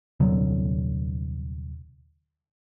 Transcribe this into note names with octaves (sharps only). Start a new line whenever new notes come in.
D#1 C2 D3 F#3